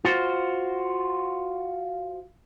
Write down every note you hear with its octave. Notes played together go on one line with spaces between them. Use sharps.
F4 F#4 C5